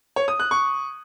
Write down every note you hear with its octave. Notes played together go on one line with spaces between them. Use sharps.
C#5
D#6
F#6
C#6